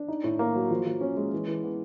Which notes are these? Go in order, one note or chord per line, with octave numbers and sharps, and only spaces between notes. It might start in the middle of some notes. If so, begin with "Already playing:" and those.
Already playing: D4
D#4
A2
A#3
F#3
F3
F3
C#4
G#3
E3
E3
B3